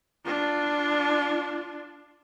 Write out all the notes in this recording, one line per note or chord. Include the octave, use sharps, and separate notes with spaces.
D4 F4